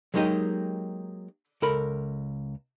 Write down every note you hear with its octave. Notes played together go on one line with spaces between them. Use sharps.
F#3 G#3 A#3 D#4 G4 D#5
C#2 A4 A#4 B5